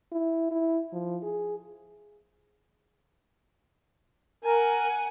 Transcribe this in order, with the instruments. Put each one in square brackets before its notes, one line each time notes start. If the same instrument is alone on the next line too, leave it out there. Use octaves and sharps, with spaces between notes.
[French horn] E4
E4
F3
G#4
[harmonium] A#4 [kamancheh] F#5 G#5